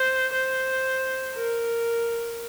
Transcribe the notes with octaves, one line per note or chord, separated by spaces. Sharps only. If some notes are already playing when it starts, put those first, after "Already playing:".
Already playing: C5
C5
A#4